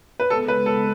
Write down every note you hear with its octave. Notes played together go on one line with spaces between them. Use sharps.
B4
C#3 G#3 B3 A4
B4
A4